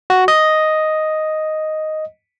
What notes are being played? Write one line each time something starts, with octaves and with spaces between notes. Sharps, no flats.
F#4
D#5